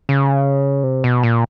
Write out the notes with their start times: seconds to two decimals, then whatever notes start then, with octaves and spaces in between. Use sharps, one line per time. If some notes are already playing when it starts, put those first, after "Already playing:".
0.09 C#3
0.83 C3
1.04 B2
1.23 A#2